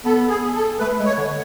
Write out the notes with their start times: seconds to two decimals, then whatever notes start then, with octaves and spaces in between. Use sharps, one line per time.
0.05 B3 A4
0.29 G#4
0.55 A4
0.80 A3 B4
0.99 G#3
1.05 C#5
1.17 D3